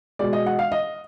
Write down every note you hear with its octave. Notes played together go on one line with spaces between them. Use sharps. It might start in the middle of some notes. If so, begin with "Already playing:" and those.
B2 G#3 D5
D#5
F#5
F5
D#5